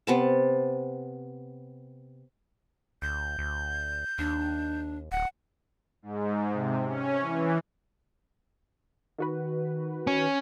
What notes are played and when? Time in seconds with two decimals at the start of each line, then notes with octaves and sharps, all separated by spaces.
0.07 C3 B3 A5
3.02 D2 G6
3.38 D2
4.18 D#2 D4
5.12 D1 F#5
6.02 G#2
6.53 C3
6.86 C#4
7.21 E3
9.18 D#3 F#4 B4
10.07 C#4